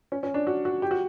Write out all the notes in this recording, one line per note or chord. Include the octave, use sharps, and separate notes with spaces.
C#4
C#4
D4
F#4
F#4
G4
F#4